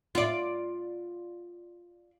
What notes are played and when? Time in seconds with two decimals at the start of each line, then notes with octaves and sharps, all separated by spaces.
0.15 F4 D5